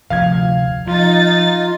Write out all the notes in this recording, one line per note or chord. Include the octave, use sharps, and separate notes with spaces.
F1 D2 F3 F5 G#6
F3 D#4 F4 A6